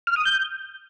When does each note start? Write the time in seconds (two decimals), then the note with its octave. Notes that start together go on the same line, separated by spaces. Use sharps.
0.07 F6
0.16 D#6
0.25 G6